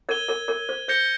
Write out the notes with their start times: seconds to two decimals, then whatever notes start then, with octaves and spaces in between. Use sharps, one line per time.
0.09 A#4 C#5 G#6 D#7 G7
0.28 A#4 C#5
0.48 A#4 C#5
0.69 C5
0.88 C5 G6 A#6 C#7 G7